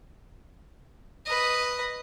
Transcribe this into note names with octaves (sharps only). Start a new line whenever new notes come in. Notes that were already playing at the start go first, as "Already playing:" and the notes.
B4 D#5